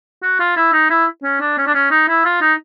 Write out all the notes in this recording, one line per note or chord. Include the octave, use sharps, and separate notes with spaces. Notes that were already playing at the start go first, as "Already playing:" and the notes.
F#4
F4
E4
D#4
E4
C#4
D4
C#4
D4
C#4
D#4
E4
F4
D#4